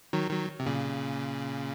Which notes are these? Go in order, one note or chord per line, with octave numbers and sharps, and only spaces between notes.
D#3 F#3
D#3 F#3
C3
A#2 C#3